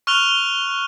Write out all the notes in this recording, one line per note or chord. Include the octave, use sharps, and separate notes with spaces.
C#6 F6 F#6 F7 G7